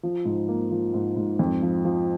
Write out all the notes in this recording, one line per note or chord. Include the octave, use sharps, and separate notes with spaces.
F3
G#2
A#3
F3
G#2
G#2
F2
F3
F3